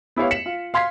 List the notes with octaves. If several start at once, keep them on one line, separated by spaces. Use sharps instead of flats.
B3 E4 G4 C#5 F5
B6 C#7 E7 F#7
F4
F5 C6 G#6 B6 C7